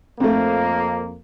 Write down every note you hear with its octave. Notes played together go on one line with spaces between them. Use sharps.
F2 A3 A#3 C4